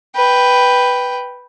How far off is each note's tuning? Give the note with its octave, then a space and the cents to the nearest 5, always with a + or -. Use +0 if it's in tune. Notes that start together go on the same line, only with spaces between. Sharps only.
B4 +0 G5 +0